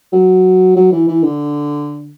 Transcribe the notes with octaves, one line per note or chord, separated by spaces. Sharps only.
F#3
F#3
E3
E3
D3